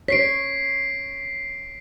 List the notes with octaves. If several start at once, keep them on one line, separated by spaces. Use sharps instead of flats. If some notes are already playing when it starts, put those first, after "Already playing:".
C#5 B6 C7 D7